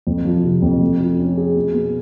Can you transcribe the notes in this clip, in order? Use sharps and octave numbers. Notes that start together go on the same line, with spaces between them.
F2
F3
C3
F2
A3
F4
C#4
G#4
B2
B3